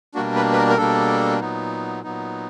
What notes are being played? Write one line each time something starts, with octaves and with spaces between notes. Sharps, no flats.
B2 G3 A#3 D4 F#4
B4
B4
A#4
A#4
B2 G3 A#3 D4 A4
A#2 F#3 B3 D#4
A#2 F#3 B3 D#4